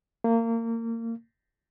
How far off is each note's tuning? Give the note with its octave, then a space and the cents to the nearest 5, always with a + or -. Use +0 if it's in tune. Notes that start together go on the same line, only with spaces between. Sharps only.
A#3 -25